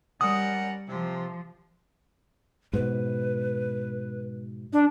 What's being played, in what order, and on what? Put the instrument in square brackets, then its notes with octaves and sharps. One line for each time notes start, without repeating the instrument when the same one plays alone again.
[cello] G3 [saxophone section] C#4 A#4 F#5 [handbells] D#6
[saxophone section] C3 [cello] F3
[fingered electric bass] G#2 B2 [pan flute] B4
[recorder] D4